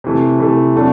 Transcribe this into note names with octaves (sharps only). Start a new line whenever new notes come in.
C3 E3 A3
C3 E3 A3
C3 F#3 A3 D4